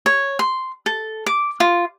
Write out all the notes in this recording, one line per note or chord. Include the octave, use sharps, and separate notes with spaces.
C#5
C6
A4
D6
F4